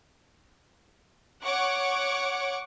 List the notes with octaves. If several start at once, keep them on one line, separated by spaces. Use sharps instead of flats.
C#5 F#5 C#6 D6